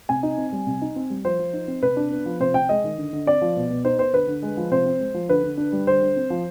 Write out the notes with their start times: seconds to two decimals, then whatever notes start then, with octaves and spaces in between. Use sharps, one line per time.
0.09 C3 G#5
0.23 D#4
0.37 C4
0.53 G3
0.67 C3
0.82 D#4
0.96 C4
1.10 G3
1.25 F3 C5
1.39 F3
1.53 D#4
1.68 C4
1.83 C3 B4
1.96 D4
2.11 B3
2.26 F3
2.40 C3 C5
2.54 C3 G5
2.69 G#3 D#5
2.84 D#3
2.98 D3
3.13 D3
3.26 C4 D5
3.42 F3
3.56 B2
3.70 B2
3.85 D#4 C5
3.98 B3 C5
4.13 D3 B4
4.27 D3
4.42 G#3
4.57 F3
4.71 C3 C5
4.86 C4
5.00 G#3
5.14 F3
5.29 D3 B4
5.43 D3
5.57 D4
5.73 G3
5.87 D3 C5
6.02 D3
6.16 C4
6.30 F3